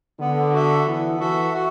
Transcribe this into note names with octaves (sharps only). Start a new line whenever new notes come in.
D3 B3
F#4 A4 E5
E3 B3
E3 F#4 A4 E5
F#4